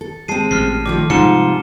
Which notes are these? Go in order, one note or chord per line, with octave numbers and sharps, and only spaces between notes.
A4
G#3 C4 A5 C7 D#7
A1 A#2 F6 C7
D#3 F3 A3 D6
G#2 C3 F3 G3 F4 C#7 E7 G7